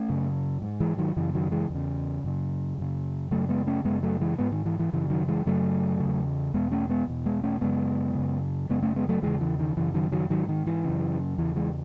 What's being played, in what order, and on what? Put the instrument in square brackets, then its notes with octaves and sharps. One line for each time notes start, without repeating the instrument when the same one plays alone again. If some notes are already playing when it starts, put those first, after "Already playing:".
Already playing: [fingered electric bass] A3 C#4
F#2 C#3
G#2
E3 G#3
D#3 F#3
F#2 C#3 E3
D#3 F#3
E3 G#3
E2
C#3
F#2 C#3
F#2 C#3
F#2 C#3 F#3 A3
G#3 B3
A3 C#4
F#2 C#3 G#3 B3
F#3 A3
E3 G#3
G#2 G#3 B3
D#3
E3
E3
F#2 C#3 E3
D#3 F#3
E3 G#3
F#2 C#3 F#3 A3
C#3
E2
E2 B2 G#3 B3
A3 C#4
G#3 B3
E2 B2
G#3 B3
A3 C#4
F#2 C#3 G#3 B3
F#2 C#3
F#2 C#3 G#3 B3
A3 C#4
G#3 B3
F#3 A3
E2 C#3 E3 G#3
E3
D#3
F#2 C#3 E3
D#3 F#3
D#3 F#3
G#2 D#3 F#3
D#3
E3
F#2 C#3
E2 C#3 E3
E3 G#3